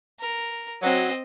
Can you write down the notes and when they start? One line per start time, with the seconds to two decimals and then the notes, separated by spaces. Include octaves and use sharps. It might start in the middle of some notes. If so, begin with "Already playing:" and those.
0.19 A#4
0.82 F#3 C4 D#5